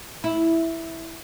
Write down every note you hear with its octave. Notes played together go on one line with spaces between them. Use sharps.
E4